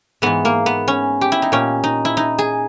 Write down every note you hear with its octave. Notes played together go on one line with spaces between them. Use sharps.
G#2 E3 B3
A#3
B3
C#4
G4
E4
D#4
A#2 C#4
D#4
E4
D#4
G#4